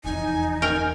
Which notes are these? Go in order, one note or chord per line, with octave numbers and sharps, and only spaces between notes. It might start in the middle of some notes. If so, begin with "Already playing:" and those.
F1 E2 D#4 G#5
A#4 G5 G#5